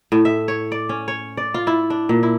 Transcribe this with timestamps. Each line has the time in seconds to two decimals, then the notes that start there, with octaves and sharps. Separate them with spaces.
0.12 A2
0.25 E5
0.48 C#5
0.72 D5
0.89 C#4
1.08 C#5
1.37 D5
1.54 F4
1.67 E4
1.90 D4
2.09 A#2
2.23 E4